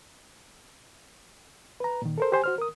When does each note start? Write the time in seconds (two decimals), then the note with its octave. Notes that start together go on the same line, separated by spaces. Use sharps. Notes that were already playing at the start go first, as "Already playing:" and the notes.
1.80 B4 A#5
2.02 A#2 D#3
2.18 A4 A#4 C5
2.32 G4 C5 G#5
2.44 F#4 C5 F6
2.58 A#4 D#6